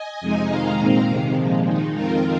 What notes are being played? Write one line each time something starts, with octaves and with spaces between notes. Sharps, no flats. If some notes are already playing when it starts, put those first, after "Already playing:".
Already playing: D#5 G#5
F2 C3 G#3 D#4
F2 D#3 G#3 D#4 F5 A#5
A#2 G#3 C4 F5 A#5
F2 C3 D#3 G#3
A#2 F3 G#3
D#3 G#3 D#4
F2 D#3 C4 F4 A#4